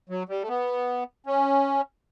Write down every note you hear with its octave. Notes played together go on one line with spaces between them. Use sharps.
F#3
G3
A3
B3
C#4